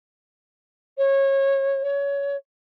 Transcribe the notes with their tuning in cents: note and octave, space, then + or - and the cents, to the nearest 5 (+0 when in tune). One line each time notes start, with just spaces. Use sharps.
C#5 -25
C#5 +20